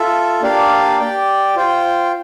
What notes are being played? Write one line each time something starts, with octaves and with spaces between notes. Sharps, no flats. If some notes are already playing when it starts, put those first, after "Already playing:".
Already playing: F4 A4 E5
A#3 D4 G4 D5 F5
G4 D5 G5
F4 C5 G5